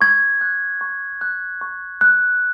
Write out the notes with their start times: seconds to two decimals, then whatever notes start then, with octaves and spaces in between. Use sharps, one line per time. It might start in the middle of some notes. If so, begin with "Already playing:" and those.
0.01 C#6 G#6
0.41 F#6
0.81 C#6
1.21 F#6
1.61 C#6
2.01 F#6